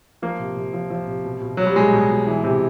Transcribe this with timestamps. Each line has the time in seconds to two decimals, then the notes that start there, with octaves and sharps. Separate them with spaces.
0.22 F3 A#3
0.39 C3
0.56 C3
0.73 F3
0.90 F3
1.08 C3
1.25 B2
1.42 B2
1.57 B2 F#3
1.66 G3
1.76 B2 G#3
1.93 B2
2.10 B2
2.27 E3
2.44 C3